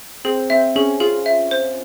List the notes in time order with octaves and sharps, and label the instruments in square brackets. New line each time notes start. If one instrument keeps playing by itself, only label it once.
[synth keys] C4 [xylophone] G#4
[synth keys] C4 [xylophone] E5
[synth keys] C#4 [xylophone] G#4
[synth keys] F4 [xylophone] G#4
[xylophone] E5
C5